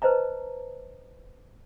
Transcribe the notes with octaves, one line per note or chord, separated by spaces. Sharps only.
B4 C5 D#5 A5 A#5